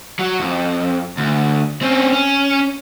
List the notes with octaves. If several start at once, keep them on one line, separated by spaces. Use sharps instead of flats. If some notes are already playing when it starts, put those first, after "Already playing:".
F#3
F2
D2
C4 C#4
C#4